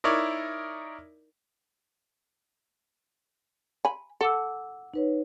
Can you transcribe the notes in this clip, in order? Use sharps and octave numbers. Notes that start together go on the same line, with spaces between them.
D#4 E4 A#4 C#5 D5
G#5 B5
A4 F#5 D6 E6
D#4 B4 C#5